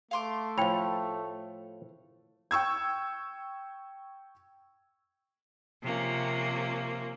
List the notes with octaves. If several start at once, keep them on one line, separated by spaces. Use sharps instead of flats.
A3 F5 C6 D6
A2 F3 G5 B5
G5 C#6 E6 G#6
C3 F3 A#3 C#4